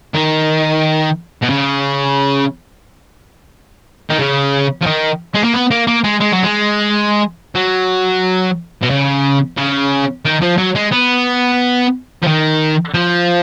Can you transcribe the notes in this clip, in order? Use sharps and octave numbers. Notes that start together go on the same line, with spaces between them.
D#3
B2
C#3
D#3
C#3
F3
D#3
G#3
A#3
B3
A#3
A#3
G#3
G#3
F#3
G#3
F#3
B2
C#3
C#3
D#3
F3
F#3
G#3
B3
F3
D#3
F3